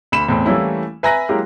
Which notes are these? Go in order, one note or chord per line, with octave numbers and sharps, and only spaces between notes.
D2 B5 E7
E2 A2 C4
E3 G3 A3 A#3 C#4 E4
B4 E5 G#5 A#5 F#6 A#6
F#3 G#3 A#3 E4 G4 A#4